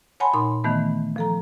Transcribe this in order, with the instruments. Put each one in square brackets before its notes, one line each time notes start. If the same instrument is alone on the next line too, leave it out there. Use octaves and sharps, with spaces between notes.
[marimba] C#5 F#5 G#5 A5 B5 C6
A#2 D#4 C6
D#3 E3 A3 B3
F3 A4 A#5